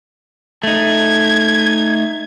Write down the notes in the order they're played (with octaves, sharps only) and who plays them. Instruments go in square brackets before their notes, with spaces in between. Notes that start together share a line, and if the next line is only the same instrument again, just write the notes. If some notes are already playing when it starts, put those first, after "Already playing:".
[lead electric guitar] A3 D#4 [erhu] G#6